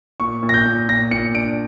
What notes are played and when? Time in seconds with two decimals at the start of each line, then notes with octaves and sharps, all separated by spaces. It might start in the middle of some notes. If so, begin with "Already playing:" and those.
0.20 A#2 C#6
0.43 A#2
0.49 A#6
0.54 G6
0.65 A#2
0.89 A#2 A#6
1.11 A#2 C#7
1.35 D4 D7